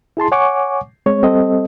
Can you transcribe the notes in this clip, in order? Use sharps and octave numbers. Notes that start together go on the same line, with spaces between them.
E4 G#4 A5 C6
C#5 F#5 G#5 C#6 D6
G#3 C4 C#5
G3 C4 A4 D#5